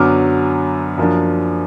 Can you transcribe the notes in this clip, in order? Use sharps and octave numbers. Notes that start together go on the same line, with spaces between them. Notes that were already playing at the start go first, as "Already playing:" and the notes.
Already playing: F#2 D3 F#3 B3 D6 F6
F#2 F3 A#3 D4